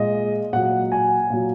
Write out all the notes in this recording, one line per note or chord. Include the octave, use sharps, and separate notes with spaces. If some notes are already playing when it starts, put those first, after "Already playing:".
Already playing: A#2 G#3 D#5
A#2 F#3 F#5
G#5
A#2 F#3